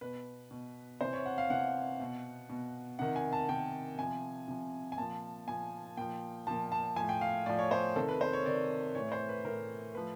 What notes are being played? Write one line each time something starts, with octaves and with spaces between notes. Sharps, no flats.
B2 B4
B2
C3 E3 C5
C#5
F#5
F5
C3 E3 F#5
B2
B2
C3 D#3 F#5
G#5
A5
C3 D#3 G5
C3 F3 G#5
C3 F3
G#5
A#2 F3 A5
A#2 F3 G#5
A#2 F3 G5
A#2 F3 A5
A5
A2 F3 G#5
G5
F5
A2 F3 D5
C#5
C5
C3 D#3 A4
B4
C5
C#5
C3 D#3 D5
A2 E3 C#5
C5
B4
A2 E3 A#4
A2 F3 B4